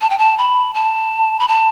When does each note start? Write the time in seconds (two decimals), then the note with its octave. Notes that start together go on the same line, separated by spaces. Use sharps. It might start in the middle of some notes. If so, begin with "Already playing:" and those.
0.01 A5
0.10 G5
0.18 A5
0.38 B5
0.74 A5
1.40 B5
1.48 A5